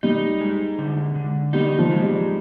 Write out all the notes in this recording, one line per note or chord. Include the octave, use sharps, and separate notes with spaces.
G3 D#4
G#3
D3
D3
G3 D#4
F3
G#3
G3